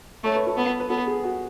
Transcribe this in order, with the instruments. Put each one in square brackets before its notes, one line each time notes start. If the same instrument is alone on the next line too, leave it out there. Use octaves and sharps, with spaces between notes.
[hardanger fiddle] A3 [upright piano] C#5
[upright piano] B4
A4
[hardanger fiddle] B3 [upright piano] B4
[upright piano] B4
[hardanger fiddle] B3 [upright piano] A4
[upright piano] G#4
F#4